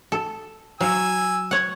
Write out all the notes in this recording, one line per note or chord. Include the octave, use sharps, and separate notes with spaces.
A4
F#3 F5 G#5 E6
C#5 F#5